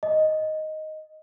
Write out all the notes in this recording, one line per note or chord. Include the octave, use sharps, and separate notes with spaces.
D#5